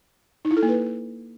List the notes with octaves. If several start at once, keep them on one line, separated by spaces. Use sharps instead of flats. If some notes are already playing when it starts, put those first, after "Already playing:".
D#4
E4
A4
A#3
B4